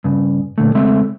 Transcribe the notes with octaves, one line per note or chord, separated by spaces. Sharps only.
G2 C#3
A#2 D3 A3
C#3 G#3 A3 C4 E5